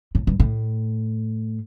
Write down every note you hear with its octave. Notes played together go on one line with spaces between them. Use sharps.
A2
G2
A2